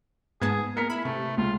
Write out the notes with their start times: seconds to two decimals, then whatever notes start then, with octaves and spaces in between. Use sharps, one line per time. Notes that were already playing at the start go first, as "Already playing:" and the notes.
0.42 G#2 B3 G#4 A5 G#6
0.77 A#4 F6 B6 C#7
0.90 E4 B5
1.05 C3 A3
1.38 C#2 F4